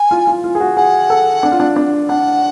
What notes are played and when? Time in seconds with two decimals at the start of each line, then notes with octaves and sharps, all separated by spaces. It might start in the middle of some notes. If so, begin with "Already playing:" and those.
Already playing: G#5
0.11 F4
0.27 F4
0.44 F4
0.55 G#4
0.60 F#4
0.77 G#4 F#5
1.10 A4
1.43 D4
1.52 F4
1.60 D4
1.76 D4
2.08 D4 F#5